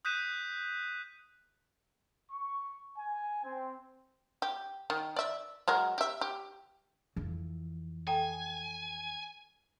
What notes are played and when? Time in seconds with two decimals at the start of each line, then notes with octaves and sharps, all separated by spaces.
0.05 D#6 F#6 G6 B6 D#7 E7
2.30 C#6
2.98 G#5
3.43 C4
4.42 G4
4.90 D#3
5.16 D5 E5
5.68 F#3 G#3 A#4
5.98 G4 E5
6.21 G4
7.16 F2 E3
8.07 A4 G5 G#5 A#5